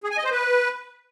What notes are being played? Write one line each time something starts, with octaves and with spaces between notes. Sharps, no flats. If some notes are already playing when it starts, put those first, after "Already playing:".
G#4
G#5
D#5
C5
B4